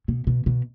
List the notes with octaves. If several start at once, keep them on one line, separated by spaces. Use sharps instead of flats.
B2
B2
B2